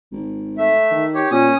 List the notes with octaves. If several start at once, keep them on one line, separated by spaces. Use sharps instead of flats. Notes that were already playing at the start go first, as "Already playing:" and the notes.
G#1
A3 E5
D#3
G4 C#5
A#2 C#4 D#6